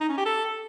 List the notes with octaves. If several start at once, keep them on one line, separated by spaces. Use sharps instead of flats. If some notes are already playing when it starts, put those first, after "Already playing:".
D#4
C#4
G4
A4